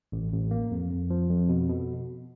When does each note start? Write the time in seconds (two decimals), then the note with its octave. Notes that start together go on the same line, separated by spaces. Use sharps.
0.12 A1
0.32 A1
0.51 A#3
0.71 F2
0.90 F2
1.10 F3
1.29 F2
1.49 B2
1.69 B2